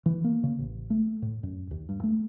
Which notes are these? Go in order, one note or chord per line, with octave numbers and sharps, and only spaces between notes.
E3
A#3
C#3
A1
A3
A2
F#2
D#2
G2
A3